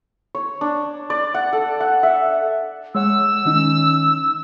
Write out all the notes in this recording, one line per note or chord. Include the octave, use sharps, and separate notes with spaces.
C#5
D4
D5
F#5
A4
F#5
E5
G#3 C#5 F#5 E6
D#3 C#4 D#4